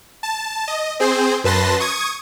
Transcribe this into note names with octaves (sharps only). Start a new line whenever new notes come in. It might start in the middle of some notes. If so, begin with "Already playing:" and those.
A5
D#5
C4 G#4 C5
F#2 B4 A5 C6 A#6
C#6 D#6 G#6